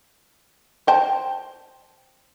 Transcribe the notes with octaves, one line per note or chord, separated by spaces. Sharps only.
C5 G5 A5